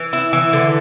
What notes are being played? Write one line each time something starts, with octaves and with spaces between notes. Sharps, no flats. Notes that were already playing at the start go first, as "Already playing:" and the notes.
Already playing: E3
E4
E3
D3